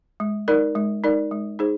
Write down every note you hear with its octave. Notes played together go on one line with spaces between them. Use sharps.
G#3
D#4 A#4 D5
G#3
D#4 A#4 D5
G#3
D#4 G#4 C5